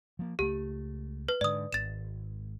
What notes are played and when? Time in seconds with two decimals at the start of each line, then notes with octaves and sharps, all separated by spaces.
0.19 F3 A#3
0.39 C#2 A3 G4
1.28 B4
1.41 G#2 D3 D5 D#6
1.73 G#1 A6 E7